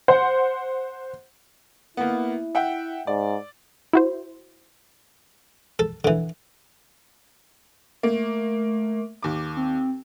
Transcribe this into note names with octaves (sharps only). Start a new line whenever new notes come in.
C5 F#5
A#3 B3 E4
E5 F#5 G5
G#2 D5
E4 F#4 C5
A4
D3 E3
A3 A#3
D#2 D6
C4